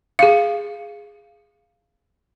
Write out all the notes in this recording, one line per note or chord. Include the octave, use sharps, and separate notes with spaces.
G#4 F5